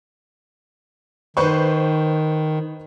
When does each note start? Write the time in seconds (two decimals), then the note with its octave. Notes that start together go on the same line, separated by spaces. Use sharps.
1.37 D#3 B4 C5 C#6